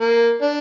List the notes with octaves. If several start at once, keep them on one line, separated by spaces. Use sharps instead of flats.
A#3
D4